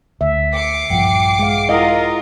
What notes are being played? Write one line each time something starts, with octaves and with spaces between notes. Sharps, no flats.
D2 E5
D6 C7 C#7
A#1 G2 F3 F#5 G5
G#3 F5
E4 F4 A#4 D#5 F5 F#5